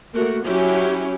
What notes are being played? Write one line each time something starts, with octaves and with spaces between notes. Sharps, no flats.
A3 A#3 F#4
F#3 C#4 E4 G4